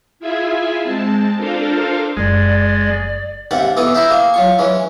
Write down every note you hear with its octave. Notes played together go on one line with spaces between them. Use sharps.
E4 F4 G#4 E5 G#5
G#3 C4 A5
D4 F4 A4 A#4 C5 F5
F#1 G#3 D5
D#2 G#2 C3 F#5 A5
B2 E3 A4 D6 D#6
E4 A#4 C5 E5
A#3 G#4
F#3 F4 C#6
E3 G#3 C#4